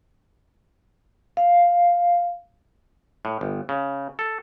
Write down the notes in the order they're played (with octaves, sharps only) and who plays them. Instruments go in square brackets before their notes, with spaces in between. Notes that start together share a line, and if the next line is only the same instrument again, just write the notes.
[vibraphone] F5
[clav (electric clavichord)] A2
G1
C#3
A4